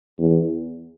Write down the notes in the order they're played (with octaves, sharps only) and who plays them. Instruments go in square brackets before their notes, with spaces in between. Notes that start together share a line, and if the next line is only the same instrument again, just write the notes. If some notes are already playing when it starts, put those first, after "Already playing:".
[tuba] E2